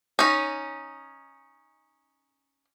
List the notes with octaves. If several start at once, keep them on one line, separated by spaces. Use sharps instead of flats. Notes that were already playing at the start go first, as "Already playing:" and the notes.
C#4 D#4